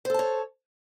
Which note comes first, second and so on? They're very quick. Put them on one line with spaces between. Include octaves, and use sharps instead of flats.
C5 A4 A5 C#5